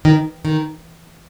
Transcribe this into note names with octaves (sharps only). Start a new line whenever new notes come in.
D#3
D#3